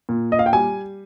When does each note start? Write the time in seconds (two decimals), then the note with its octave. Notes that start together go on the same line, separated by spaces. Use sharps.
0.09 A#2
0.32 D#5
0.39 F5
0.46 G5
0.53 G3 G#5